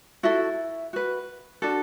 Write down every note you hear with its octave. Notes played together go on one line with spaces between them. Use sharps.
E4 F#4 A4 E5
F#4 B4
D4 F#4 A4